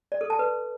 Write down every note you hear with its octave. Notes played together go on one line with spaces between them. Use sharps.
D5
A4
A5
B4